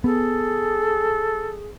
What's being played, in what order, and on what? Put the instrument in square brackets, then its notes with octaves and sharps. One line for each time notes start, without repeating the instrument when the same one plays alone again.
[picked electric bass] B3 [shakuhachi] G#4 [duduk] A4